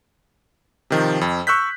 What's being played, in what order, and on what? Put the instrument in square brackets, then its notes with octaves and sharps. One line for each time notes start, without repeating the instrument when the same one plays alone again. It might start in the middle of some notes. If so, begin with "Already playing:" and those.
[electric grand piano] C3 D#3 F3
F2
C#6 E6 F#6 G6 B6